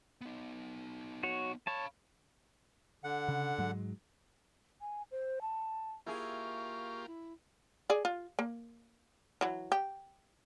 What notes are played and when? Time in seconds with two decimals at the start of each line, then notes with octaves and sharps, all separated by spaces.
0.21 B3 D#4
1.23 F#4 C#5
1.67 C#5 F5 A5 B5
3.04 D3 F#5
3.28 C#3
3.58 G#2 F#3 G#3
4.81 G#5
5.11 C5
5.41 A5
6.07 A#3 E4 F4 G4 G#4 C#6
7.07 E4
7.90 G#4 D5
8.05 F4
8.39 A#3
9.41 E3 F#3
9.72 G4